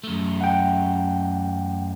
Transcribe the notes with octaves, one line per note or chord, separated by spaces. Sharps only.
F#2 A3
F#5 G5